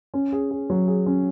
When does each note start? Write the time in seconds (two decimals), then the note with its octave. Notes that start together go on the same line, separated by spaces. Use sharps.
0.14 C#4
0.33 G#4
0.51 G#4
0.70 F#3
0.88 G#4
1.06 C#4